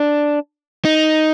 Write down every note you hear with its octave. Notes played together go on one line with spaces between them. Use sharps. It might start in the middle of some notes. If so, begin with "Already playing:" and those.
Already playing: D4
D#4